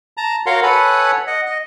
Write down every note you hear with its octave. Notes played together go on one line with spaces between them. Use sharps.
A5 A#5
F#4 A#4 C#5 F5 F#5 C6
A4 B4 C#5 F#5 G#5 B5
D#5 F#5
D#5